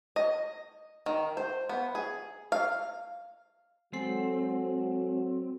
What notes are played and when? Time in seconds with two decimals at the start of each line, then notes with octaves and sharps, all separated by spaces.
0.16 D#5
1.06 D#3
1.37 C5
1.69 B3
1.95 G#4
2.52 F5
3.93 F#3 G#3 C4 A4 F#5